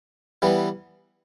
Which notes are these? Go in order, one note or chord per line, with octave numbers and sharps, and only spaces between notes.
E3 G3 B3